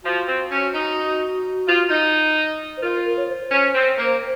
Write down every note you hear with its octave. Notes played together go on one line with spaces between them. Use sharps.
F3 F#4
C4
C#4
D#4
F4
D#4
C5
F4 A#4
A#4
C#5
C5
C#4
C4
A#3